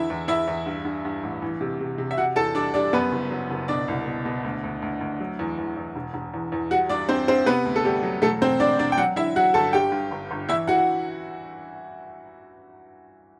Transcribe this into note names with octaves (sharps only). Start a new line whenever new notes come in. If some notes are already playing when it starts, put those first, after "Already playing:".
Already playing: E2 D3 E4 E5
E2
E2 E4 E5
E2
G2
G2
G2
A1
E3
C3
C3
C3
E5
C3 F#4 F#5
E2 A4 A5
G3 D4 D5
G3 D4 D5
F#2 B3 B4
F#1
F#3
F#1
B2 D4 D5
C2
B2
B2
D2
D2
D2
D2
F#3
E2
E2
E2
E1
E1
E2
E2
G3 F#4 F#5
G2 D4 D5
G2 C4 C5
G2 C4 C5
C3 B3 B4
D2
A4
D2 G3 G4
F#3
E1 A3 A4
E1 C4 C5
E1 D4 D5
E1 D4 D5
G5
F#3 F#4 F#5
D3 E4 E5
F#3 F#4 F#5
G1 A4 A5
G2 G4 G5
G2
G1
G1
E3 E4 E5
E3 F#4 F#5
F#5